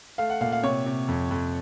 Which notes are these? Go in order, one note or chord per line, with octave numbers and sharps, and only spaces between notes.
A3 F5
F#5
A#2 F5
F5
C3 C#5
C3
F2
F2